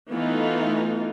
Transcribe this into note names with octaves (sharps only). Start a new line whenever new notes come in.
E3 A3 B3 D#4 F4